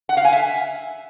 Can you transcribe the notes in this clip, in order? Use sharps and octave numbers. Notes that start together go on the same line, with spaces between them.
F#5
F5
G#5
E5